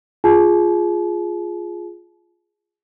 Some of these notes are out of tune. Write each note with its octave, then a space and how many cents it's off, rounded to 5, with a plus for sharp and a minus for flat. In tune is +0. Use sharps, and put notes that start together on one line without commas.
F4 +0 G#4 +0 A5 -40